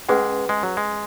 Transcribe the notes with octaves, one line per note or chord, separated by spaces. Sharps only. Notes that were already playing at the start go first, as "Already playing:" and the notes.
G#3 C#4 G#4 B4 F#5
G#3
F#3
G#3